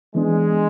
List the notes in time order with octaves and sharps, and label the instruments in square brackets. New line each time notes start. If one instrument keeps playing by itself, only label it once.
[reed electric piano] E3 B3 D4 [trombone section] G#3